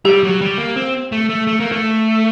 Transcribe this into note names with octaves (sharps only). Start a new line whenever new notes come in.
G3 G4
F#3
G3
A#3
C4
A3
A3
A3
A#3
A3